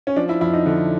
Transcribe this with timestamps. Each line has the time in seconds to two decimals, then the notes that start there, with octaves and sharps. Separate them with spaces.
0.07 C#4
0.16 F3 D4
0.29 E4
0.41 F2 E4
0.53 D#4
0.66 D3